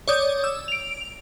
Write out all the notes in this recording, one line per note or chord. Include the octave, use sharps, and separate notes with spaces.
C#5 D5 D6 D#6 G6
E6
D7 F7